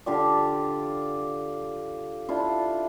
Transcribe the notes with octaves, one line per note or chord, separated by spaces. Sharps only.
D3 F4 G4 D5
D4 E4 F4